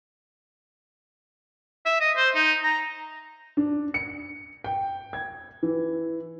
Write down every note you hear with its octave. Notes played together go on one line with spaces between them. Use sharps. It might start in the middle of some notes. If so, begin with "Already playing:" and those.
E5
D#5
C5
D#4
A#5
D4
C#7
G5
G#6
E3